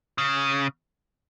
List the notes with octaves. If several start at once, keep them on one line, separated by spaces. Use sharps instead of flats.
C#3